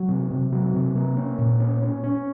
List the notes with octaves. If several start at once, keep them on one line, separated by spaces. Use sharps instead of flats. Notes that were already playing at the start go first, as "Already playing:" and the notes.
Already playing: F#3
C3
C3
F#3
C3
A#3
C#4
A#2
C#4
C#4
C#4